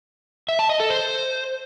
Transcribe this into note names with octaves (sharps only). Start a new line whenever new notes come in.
E5
A5
D#5
A4
C5